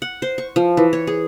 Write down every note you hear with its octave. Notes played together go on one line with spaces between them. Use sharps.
F#5
C5
C#6
F3
E3
C#5
G#4